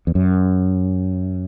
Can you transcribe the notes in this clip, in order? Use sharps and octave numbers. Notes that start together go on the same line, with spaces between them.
E2
F#2